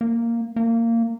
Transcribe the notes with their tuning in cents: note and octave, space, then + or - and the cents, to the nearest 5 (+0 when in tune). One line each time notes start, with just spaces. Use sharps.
A#3 -5
A#3 -20